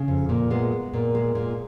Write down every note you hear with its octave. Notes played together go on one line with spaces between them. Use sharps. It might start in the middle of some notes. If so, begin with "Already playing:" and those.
Already playing: C#3
F2
A#2 A#3
G#3 B3
G#3
A#2
G#3
A#2